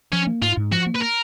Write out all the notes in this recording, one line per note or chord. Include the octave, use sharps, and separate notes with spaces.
F3 C#4
A#3
G#2 F4
G#2
F3 F#4
A#3
B4
A#4